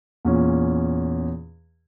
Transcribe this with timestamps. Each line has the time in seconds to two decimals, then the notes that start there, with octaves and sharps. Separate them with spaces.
0.25 E2 A#2 C#4